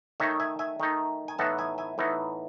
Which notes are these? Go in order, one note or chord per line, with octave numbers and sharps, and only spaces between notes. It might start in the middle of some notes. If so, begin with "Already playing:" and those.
D#3 A3 D#4 C#5 E5
E5 G#5
E5 G#5
D#3 A3 D#4
G#5
A2 E3 B3 D#4 F#5 A5
E5 G#5
E5 G#5
A2 E3 B3 D#4